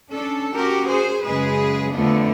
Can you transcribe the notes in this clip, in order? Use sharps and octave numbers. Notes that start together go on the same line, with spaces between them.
C#4 D4 A4
C#4 F#4 G4 A#4
G#4 C5
F#2 C#3 G#3 G#4 B4
F2 D3 F3 A3 B3 D4